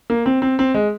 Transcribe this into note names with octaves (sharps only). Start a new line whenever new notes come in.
A#3
C4
C4
C4
G#3